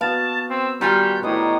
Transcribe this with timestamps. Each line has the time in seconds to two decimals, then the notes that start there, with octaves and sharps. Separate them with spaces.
0.01 B3 F#4 F5 A5
0.50 C4 E6
0.81 D#3 G3 F4 F#4 G#5 G6
1.23 A2 B3 D#4 G4 D#6